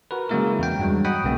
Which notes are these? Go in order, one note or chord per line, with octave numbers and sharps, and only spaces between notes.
F#4 A#4 B4
C#3 F#3 G#3 A#3 E4 A#4
E2 F#4 G5
G2 F#3 G#3
C#5 D#5 F#5 G5 B5 D#6
B1 C#3 A#3